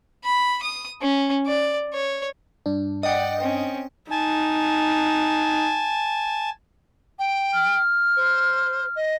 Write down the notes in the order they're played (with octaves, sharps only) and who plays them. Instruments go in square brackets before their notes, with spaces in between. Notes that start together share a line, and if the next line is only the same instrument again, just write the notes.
[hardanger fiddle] B5
D#6
C#4
D5
C#5
[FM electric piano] G2 D4
[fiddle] D5 F#5 [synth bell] D#5 G5
[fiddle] C4 C#4
[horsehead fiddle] D#4 [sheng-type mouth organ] G#5 A5
[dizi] G5
[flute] F6
[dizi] C5
D#5